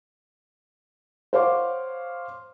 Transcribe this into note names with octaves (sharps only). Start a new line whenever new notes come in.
C5 C#5 F5 F#5 C6 D6